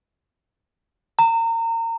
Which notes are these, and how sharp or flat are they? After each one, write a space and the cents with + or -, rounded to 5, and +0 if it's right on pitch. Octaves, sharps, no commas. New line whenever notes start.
A#5 -30